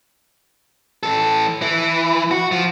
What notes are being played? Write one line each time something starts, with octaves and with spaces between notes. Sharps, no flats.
E3 A4
E3
F#4
F3